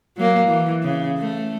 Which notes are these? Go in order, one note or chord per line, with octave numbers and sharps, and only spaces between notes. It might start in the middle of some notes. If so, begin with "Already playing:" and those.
F#3 A#3
E3
C#3
A3